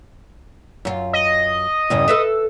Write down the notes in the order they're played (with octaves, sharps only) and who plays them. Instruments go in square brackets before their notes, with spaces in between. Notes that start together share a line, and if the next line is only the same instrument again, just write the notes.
[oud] F#2 F4
[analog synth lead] D#5
[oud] E2 G2 C#3
A4 B4 E5